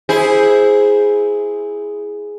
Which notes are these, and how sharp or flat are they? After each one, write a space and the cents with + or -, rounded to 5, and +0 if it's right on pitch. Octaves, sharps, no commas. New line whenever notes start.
E4 -10 G#4 +0 C5 +0